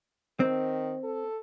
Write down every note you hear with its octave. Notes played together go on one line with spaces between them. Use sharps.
D#3 C4
A4